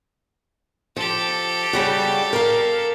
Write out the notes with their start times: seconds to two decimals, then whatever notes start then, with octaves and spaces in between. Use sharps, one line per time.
0.96 F3 G4 A4
1.73 C#3 G3 F#4
2.33 A#4 F5